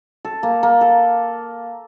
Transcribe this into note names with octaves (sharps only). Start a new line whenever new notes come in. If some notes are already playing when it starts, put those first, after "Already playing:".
A4
A#3
A#3
A4